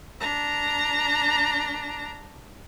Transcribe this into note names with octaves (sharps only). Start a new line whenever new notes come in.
D4 A#5